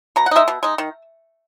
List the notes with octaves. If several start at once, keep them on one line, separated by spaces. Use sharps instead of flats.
B2 A#5
F#5
G#3 D#4 E5
B2
G#3 D#4
D#3